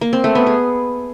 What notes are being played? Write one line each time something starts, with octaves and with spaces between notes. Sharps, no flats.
A#3
C4
A3
B3
G#4